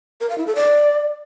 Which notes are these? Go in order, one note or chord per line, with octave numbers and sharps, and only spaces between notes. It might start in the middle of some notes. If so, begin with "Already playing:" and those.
A#4
F5
E4
A4
D5